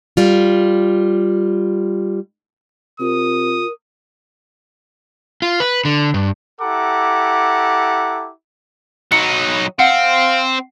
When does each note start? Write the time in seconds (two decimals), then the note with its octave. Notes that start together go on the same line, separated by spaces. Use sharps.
0.17 G3 F4
3.00 C3 F4 A#4 D#6
5.42 F4
5.60 B4
5.85 D3
6.14 G2
6.61 E4 G4 A4 F#5 A#5 D6
9.12 F#3 D#4 C#7
9.79 C4 F5 F#5